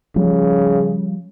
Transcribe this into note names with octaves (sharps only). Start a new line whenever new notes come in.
C#3 F3 G3